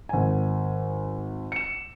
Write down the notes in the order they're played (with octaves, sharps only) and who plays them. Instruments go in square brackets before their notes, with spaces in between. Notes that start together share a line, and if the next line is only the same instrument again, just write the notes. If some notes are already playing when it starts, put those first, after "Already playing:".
[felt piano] G#1 G#5
C#7 E7